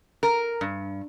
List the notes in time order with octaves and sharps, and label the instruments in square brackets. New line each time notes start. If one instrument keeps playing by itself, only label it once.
[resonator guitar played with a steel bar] A#4
G2